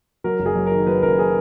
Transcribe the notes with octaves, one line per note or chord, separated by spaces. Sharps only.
F#3 A#4
F#1
G#4
F#2
D#3 A#4
F#3 B4
F#1 A#4
G#4